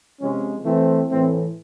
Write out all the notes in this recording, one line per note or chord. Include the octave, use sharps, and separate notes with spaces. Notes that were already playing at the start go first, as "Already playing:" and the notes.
C3 F3 G#3 C#4
E3 A3 C4
A2 E3 A3 C4